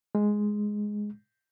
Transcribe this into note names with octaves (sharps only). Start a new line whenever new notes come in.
G#3